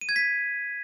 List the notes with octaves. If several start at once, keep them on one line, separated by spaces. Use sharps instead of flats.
D#7
G#6
B6